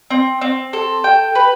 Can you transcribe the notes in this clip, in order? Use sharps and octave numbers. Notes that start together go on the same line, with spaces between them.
C4
C4
A4
G5
B4